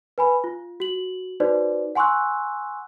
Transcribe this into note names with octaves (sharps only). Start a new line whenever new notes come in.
B4 G#5 B5
F4
F#4 F#7
D#4 F#4 B4 C5 D5
F#5 G#5 C6 C#6 E6 F#6